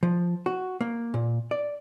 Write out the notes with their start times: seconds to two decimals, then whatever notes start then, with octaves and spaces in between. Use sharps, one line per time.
0.03 F3
0.46 F#4
0.81 A#3
1.14 A#2
1.51 D5